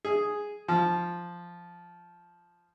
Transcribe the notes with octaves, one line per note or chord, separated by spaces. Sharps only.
G#4
F3